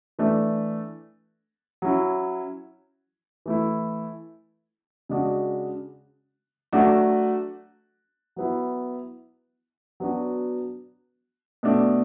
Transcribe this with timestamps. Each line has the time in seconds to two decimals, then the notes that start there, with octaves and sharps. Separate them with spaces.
0.19 E3 A3 D4
1.82 F#3 C#4 E4
3.46 E3 A3 E4
5.09 C#3 G#3 D4 F#4
6.73 F#3 A3 D4 F#4
8.36 F#3 B3 E4
10.00 F#3 B3 D4 F#4
11.63 B2 A3 D4